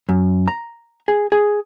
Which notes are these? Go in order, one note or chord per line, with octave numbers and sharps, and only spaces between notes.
F#2
A#5
G#4
G#4